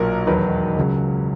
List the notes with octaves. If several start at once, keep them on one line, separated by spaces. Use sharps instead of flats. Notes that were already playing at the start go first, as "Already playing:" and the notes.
Already playing: B1 A#2 F#3 A#3 A#4
E1 D#2 D#3 F#3 B4
C#2 C#3 F#3